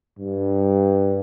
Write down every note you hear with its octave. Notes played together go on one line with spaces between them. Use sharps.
G2